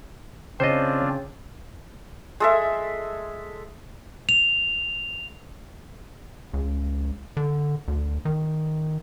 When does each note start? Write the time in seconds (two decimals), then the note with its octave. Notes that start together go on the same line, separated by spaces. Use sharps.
0.60 C#3 C4 D4 F4 C5 C#5 D#5
2.40 G#3 A4 E5
4.29 F7
6.54 C#2
7.37 D3
7.88 D2
8.25 D#3